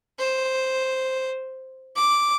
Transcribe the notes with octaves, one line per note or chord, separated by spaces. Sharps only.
C5
D6